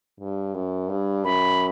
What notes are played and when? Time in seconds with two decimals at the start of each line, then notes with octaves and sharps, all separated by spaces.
0.20 G2
0.54 F#2
0.89 G2
1.24 F#2 B5